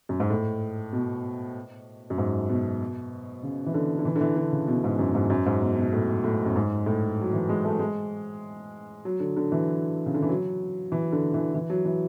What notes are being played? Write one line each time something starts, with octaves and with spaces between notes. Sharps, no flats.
F#2
G#2
A2
B2
F#2
G#2
B2
C#3
E3
D3
D3
E3
D3
E3
D3
C#3
B2
G#2
F#2
G#2
F#2
G#2
B2
B2
A2
A2
F#2
G#2
A2
F#3
E3
G#3
A3
G#3
F#3
D3
D3
E3
C#3
D3
E3
F#3
E3
D3
E3
E3
F#3
E3